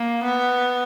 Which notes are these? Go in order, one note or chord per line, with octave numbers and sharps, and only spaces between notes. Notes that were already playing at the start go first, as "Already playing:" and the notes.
Already playing: A#3
B3